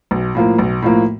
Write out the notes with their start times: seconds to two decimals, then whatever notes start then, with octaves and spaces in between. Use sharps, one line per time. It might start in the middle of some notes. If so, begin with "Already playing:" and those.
0.11 B1
0.35 A2 F3 A#3
0.59 B1
0.82 A2 F3 A#3